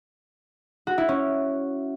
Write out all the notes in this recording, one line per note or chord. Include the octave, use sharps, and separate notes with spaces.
F#4
E4
C#4